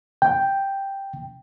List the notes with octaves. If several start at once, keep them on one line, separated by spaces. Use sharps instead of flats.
G5